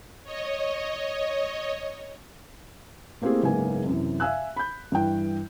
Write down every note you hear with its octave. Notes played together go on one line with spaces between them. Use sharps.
C#5 D#5
A3 A#3 C4 E4 G4 G#4
F#1 G#2 A#3 B3 G#5
F#2 C3 E3
E5 F5 G#5 E6 F#6
B5 G6
G2 E3 G5